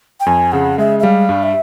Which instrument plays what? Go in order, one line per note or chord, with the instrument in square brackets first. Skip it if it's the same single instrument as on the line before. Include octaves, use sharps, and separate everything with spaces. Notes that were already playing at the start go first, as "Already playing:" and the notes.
[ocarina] G5
[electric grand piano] F2 [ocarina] G#5
[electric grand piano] C#3 [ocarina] F#5
[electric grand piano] G#3 [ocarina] E5
[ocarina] E5
[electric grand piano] G3 [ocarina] F5
[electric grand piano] G2
[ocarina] E5